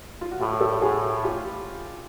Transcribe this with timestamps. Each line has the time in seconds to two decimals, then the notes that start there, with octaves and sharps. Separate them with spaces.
0.21 F4
0.32 F#4
0.40 A2 F4 G4
0.61 G4 A4
0.81 A2 F#4 G#4
1.23 F4 G4